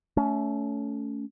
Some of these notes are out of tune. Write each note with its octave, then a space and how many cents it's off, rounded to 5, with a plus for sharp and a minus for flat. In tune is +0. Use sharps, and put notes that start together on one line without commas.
A3 +0 C#4 +25